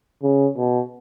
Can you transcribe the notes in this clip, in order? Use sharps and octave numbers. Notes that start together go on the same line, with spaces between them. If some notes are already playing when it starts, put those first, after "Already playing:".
C#3
B2